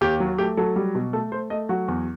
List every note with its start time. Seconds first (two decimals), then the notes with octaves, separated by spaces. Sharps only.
0.01 D#2 G4
0.20 F#3
0.38 A3 G4
0.57 F#3 A4
0.76 G3
0.95 B2
1.13 A3 A4
1.32 A3 C5
1.50 A3 D#5
1.69 F#3 F#4
1.88 E2